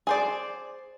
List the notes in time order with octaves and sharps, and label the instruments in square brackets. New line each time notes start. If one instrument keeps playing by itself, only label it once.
[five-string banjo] G#4 C5 D5